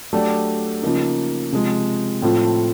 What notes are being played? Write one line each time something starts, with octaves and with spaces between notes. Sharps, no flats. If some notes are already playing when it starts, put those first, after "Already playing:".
F#3 A3 D4 G4
C#3 F3 A#3 D#4
C3 F3 G#3
A2 F3 A3 C4 F4